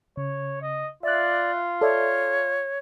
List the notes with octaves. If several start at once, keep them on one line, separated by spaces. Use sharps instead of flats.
C#3 C#5
D#5
F4 D5 E5 F#6
A4 C#5 D5 E5